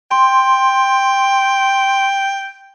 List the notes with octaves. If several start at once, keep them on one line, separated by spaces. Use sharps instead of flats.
G5 C6